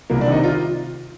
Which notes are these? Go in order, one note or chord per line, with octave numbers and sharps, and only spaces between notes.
C2 A#3
D4
C3 D#3 D#4
F4